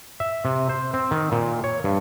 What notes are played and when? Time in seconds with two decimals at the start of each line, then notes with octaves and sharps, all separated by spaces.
0.20 E5
0.45 C3
0.69 C5
0.94 C4
1.11 D#3
1.32 A#2
1.64 C#5
1.84 G2